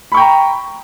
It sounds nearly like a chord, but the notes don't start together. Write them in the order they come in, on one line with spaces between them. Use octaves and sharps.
B5 C#6 G5 A#5